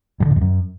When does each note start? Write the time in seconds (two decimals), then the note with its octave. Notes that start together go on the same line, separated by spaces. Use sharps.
0.20 G2
0.26 D3
0.31 A2
0.36 F2
0.41 F#2